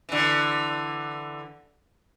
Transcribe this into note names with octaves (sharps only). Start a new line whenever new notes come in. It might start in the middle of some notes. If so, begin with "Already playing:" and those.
D3 E3